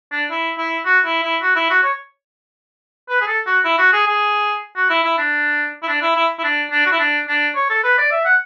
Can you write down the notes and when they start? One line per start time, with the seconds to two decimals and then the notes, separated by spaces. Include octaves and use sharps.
0.12 D4
0.31 E4
0.58 E4
0.86 F#4
1.05 E4
1.23 E4
1.42 F#4
1.56 E4
1.70 F#4
1.83 C#5
3.09 B4
3.21 G#4
3.27 A4
3.47 F#4
3.65 E4
3.78 F#4
3.93 G#4
4.07 G#4
4.76 F#4
4.90 E4
5.04 E4
5.18 D4
5.83 E4
5.88 D4
6.02 E4
6.17 E4
6.39 E4
6.44 D4
6.72 D4
6.86 F#4
6.92 E4
6.99 D4
7.28 D4
7.55 C#5
7.70 A4
7.84 B4
7.98 D5
8.12 E5
8.25 F#5